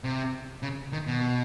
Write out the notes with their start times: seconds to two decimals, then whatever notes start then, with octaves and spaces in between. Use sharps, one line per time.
0.04 C3
0.63 C#3
0.92 D#3
1.07 B2